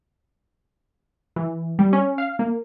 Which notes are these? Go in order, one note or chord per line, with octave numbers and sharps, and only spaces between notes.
E3
G3
C#4
F5
A#3